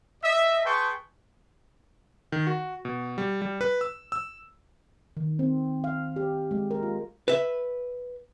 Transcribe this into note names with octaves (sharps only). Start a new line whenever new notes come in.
D#5 E5
G#4 B4 G5 A5 C6 C#6
D#3
F#4
B2
G3
G3
B4
E6
E6
D#3
C4
F5
G4
G#3
A#4
F4
B4 E5